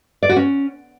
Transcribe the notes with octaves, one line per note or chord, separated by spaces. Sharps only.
D5
F#4
C#4